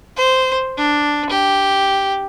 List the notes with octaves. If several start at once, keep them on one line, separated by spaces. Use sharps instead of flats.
C5
D4
G4